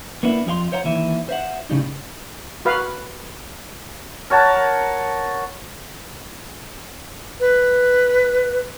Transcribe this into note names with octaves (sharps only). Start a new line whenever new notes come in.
A#3 B3 D4 E4
F2 F3 G#4 F5 C6
C5 C#5 F5 F#5 A#5
D#2 E3 E5
C5 E5 F#5
A2 C#3 G3 D#4
F#4 B4 F5
A#4 C#5 F#5 A5
B4